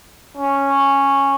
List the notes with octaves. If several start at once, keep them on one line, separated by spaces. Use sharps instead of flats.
C#4